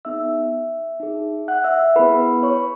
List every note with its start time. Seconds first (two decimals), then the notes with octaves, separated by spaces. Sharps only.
0.05 B3 D#4 G#4 E5 E6
1.00 D#4 G#4
1.48 F#5 F#6
1.64 E5 E6
1.96 B3 E4 G#4 B4 B5
2.43 C#5 C#6